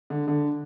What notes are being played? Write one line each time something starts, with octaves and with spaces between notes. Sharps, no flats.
D3
D3